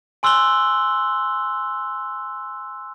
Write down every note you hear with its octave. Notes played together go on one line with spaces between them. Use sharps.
G#5 C6 E6 F#6 F#7 G7